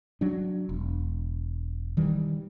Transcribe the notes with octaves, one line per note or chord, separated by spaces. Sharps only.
F#3 D4
E1
D#3 E3 G3